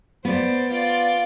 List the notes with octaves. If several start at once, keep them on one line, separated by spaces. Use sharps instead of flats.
B3 C5 D5
F4 D5